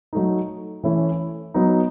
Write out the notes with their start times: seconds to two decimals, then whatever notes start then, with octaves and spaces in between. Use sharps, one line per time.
0.13 F#3 A3 D#4
0.84 E3 A3 C#4 E4
1.54 F#3 B3 D#4